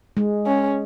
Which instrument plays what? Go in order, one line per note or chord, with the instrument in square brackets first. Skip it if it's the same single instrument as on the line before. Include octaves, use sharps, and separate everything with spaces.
[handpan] G#3
[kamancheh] C#4